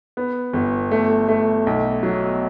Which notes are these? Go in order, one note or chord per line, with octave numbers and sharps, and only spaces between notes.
B3
G1
A3
A3
B1
F#3